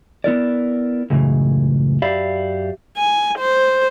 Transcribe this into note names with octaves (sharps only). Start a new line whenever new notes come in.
B3 E4 A#4 D5
C#2 F#2 A2 C#3 E3
F#2 G4 D5 E5 F5 B5
G#5
C5